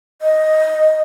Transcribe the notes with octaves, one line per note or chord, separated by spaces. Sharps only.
D#5